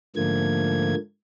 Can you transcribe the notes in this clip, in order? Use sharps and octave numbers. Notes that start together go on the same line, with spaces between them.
G#2 D3 F3 A3 A#3 G#6